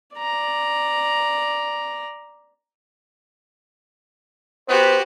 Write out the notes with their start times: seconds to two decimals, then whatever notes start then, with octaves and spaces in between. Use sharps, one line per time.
0.17 D5 A#5
4.69 B3 F#4 G4 C5